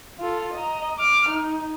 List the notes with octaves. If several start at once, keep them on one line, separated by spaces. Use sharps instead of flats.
F4 A4
D#5 A#5
D6 F6
D#4